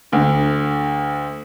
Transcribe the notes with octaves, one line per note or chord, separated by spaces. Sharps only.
D2 D3